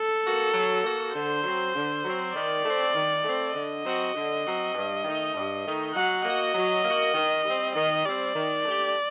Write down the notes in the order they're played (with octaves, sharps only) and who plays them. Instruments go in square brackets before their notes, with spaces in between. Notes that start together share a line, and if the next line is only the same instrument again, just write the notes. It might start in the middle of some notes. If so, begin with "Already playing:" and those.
Already playing: [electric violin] A4
[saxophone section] A#3 F#4
F#3
A#3 F#4
[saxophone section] D3 [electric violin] C5
[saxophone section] F#3 C4
D3
F#3 C4
[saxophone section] D#3 [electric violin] D5
[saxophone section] A3 C4
D#3
A3 C4
[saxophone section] D3 [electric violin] D#5
[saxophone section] F#3 C4 F#4
D3
F#3 C4 F#4
G2
D#3 A3 D#4
G2
D#3 A3 D#4
[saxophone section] F#3 [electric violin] F#5
[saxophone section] A#3 F#4 [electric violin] D#5
[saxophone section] F#3
A#3 F#4
D#3
G3 C4
[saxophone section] D#3 [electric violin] D#5
[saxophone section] G3 C4 [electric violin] D5
[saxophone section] D#3
A3 D4 G4